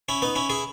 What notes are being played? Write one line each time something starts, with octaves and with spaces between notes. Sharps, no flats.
C#4 E4
B3 D#4
C#4 E4
E4 G#4